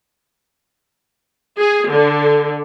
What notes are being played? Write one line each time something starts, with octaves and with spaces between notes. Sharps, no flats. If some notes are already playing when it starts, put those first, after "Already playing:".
G#4
D3